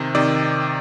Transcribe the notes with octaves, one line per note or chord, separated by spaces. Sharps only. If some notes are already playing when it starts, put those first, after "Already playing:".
Already playing: C3 D#3
C3 D#3 D5